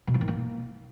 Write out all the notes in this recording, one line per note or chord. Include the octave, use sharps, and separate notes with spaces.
B2
F3
D#3
A#3